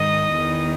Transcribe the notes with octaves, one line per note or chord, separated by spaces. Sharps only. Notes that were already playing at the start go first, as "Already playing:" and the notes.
Already playing: G#2 D#3 D#5 D#6
E2 D#3